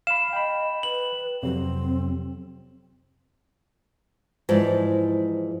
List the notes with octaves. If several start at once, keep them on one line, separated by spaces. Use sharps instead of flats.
F5 B5 E7
D#5 G5 B5
B4 F#7
F2 C3 F#3 C4
G#2 E3 F3 E4 D5